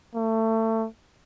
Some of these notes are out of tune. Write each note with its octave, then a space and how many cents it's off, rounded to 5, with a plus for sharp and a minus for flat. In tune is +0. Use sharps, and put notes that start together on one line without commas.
A3 +25